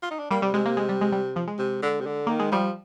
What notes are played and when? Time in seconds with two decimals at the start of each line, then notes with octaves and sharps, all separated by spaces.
0.03 F4
0.11 D#4
0.19 D4
0.31 G3 A#3
0.42 C3 G3
0.54 C3 G#3
0.66 A#3
0.77 G#3
0.89 G3
1.01 G#3
1.12 G3
1.36 F3
1.47 G#3
1.58 C3
1.83 D3
2.00 C3
2.06 D3
2.27 D#3 A#3
2.39 G#3
2.52 F3 G3